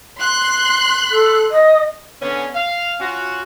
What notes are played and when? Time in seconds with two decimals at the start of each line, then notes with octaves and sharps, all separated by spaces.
0.20 C6 F#6
1.11 A4
1.51 D#5
2.21 D3 B3 C#4
2.55 F5
3.00 C#4 F4 F#4